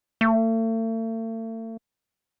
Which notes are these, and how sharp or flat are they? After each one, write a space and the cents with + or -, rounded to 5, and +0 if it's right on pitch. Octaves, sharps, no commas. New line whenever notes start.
A3 +40